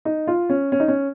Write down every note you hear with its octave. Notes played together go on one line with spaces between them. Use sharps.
D#4
F4
C#4
C#4
D#4
C#4